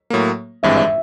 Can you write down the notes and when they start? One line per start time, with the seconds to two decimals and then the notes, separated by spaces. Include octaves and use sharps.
0.10 A2 F#3 A#3
0.63 G#1 G2 E3 G#3 C4 E5
0.77 E5